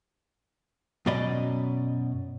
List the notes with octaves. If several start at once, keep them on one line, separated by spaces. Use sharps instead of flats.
F#2 B2 F#3 D5 D#5 B5